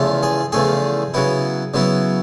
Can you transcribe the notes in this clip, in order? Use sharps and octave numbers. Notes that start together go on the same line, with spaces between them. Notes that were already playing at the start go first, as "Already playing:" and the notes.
Already playing: E2 C#3 F3 A3
G#4
E2 C#3 F3 A3 G#4
C#3 F#3 B3 E4
C#3 F#3 B3 E4